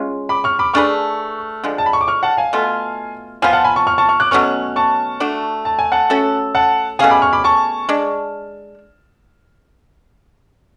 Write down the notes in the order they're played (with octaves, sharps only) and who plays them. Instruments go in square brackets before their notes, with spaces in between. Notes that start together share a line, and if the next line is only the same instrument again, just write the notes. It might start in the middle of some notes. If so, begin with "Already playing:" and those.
Already playing: [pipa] G#3 C#4 F4
[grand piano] B5 D6
C#6 F6
B5 D6
[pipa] A3 D4 G#4 B4 [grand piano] C#6 F6
[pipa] D3 F3 G#3
[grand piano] A5
B5
C#6
D6
C#6 F6
F#5 A5
F5 G#5
[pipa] B2 A3 F4
[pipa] F3 B3 F4 [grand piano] F5 G#5
[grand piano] F#5 A5
G#5 B5
A5 C#6
C#6 F6
A5 C#6
C#6 F6
D6 F#6
[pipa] B2 F#3 A3 C#4 [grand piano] C#6 F6
[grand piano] A5 C#6
[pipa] A3 D4 F#4
[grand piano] A5
G#5
F#5 A5
[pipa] A3 C#4 F#4 A4
[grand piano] F#5 A5
[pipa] B2 A3 C#4 G#4 [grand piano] F5 G#5
[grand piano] B5 D6
C#6 F6
B5 D6
A5 C#6
[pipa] G#3 D4